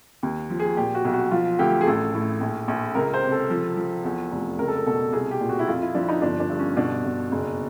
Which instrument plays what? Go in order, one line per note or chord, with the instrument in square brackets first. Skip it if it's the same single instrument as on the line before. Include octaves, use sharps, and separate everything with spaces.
[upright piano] D#2
F3
G#4
A#2 G4
F#4
B1
F#4
F3 F4
D2 G4
G#4
A1 A4
A2
A#1
A#1
C#2 A#4
C5
C3
A4
F3
F3
E2
F1
C#2 A#4
A4
A#4
B2 A4
C2 G#4
G4
A#2
F#4
E4
F2 F4
E4
F3 D4
D#4
G1 D4
D4
G2
C#4
B2 D4
B2
F#1